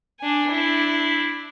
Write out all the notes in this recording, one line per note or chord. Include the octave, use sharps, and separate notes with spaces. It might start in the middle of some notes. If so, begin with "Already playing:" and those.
D4 G#5
D4 E4